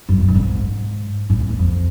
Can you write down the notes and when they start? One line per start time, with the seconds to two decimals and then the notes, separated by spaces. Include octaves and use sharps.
0.09 F#2
0.20 F#2
0.28 G#2
0.35 A2
0.39 G#2
1.30 A2
1.40 F2
1.49 E2
1.59 F2